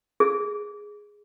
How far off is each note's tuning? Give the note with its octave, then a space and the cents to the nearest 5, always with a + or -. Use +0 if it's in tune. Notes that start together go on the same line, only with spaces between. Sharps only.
G#4 +0